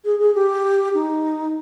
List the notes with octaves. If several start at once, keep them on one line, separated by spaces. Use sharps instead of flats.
G#4
G#4
G4
D#4